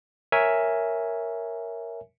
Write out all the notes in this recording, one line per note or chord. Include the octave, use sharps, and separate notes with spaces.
A#4 C#5 E5 G#5